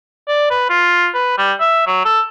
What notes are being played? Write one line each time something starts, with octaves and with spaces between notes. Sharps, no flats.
D5
B4
F4
B4
G3
E5
F#3
A4